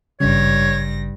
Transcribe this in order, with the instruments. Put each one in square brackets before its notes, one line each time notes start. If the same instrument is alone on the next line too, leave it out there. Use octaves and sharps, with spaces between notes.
[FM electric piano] G#1 C#3 [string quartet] G2 A#6 [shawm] C#5